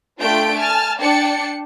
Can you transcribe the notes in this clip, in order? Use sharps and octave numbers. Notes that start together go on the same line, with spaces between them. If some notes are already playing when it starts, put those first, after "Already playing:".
A3 D4 F4 G5 G6 D7
G#5 A5 F6
D4 D5 G5 A5 C#7